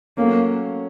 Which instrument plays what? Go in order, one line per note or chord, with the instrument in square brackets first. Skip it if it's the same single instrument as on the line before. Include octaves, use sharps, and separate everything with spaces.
[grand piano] F#3 A3 C#4 [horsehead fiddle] A#3